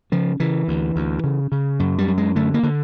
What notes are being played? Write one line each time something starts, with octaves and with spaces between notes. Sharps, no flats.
C#3 F3
C#3 E3
D2
D2
C#3
C#3
F#2
G3
F#2
G#3
D3 A3
A#3
D3